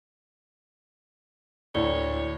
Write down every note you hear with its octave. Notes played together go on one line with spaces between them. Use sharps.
D2 A2 E4 C#5 D5 G7